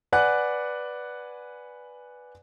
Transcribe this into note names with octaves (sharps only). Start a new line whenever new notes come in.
B4 D5 F#5 G#5 F#6